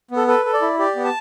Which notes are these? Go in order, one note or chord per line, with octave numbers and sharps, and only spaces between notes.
B3
A4
A4 B4
A4
D5
E4
G4 D5
B3
A5